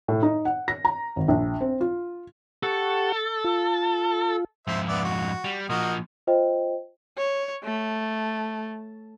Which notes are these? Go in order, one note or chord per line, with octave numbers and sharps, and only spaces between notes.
A2
D#4
F#5
A#6
A#5
G#1
A#1
C4
F4
G4 A4 F#5 C#6
F4
F2 G#2 C5 E5
B3 D5 E5
F#4
G3
A#2 F3 F#4 A#4 D#5
F4 C5 D#5 G5
C#5
A3